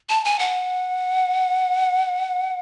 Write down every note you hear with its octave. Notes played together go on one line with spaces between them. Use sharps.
A5
G#5
F#5